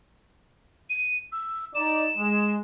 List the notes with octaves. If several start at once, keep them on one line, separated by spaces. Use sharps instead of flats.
D#7
E6
D#4 D5 E7
G#3